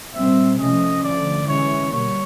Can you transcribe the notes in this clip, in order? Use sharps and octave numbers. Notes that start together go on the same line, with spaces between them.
A#2 G3 C4 E5
C3 F3 A3 C#4 D#5
D3 F3 A3 D5
E3 G#3 C#4 C#5
B2 G3 A#3 C#5